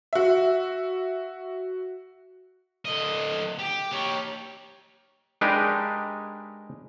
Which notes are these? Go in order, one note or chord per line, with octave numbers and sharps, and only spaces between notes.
F#4 E5
D3 D#5
G4
G4 C#5
G#3 D4 D#4 G4 A#4 B4